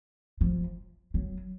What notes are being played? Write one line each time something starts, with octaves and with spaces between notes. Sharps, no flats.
F3
F#3